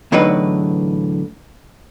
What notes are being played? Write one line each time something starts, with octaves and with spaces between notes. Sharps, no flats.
E2 A2 D3 F#3 D#4 B4